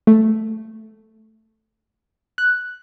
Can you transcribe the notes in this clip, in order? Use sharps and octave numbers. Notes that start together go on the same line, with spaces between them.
A3
F#6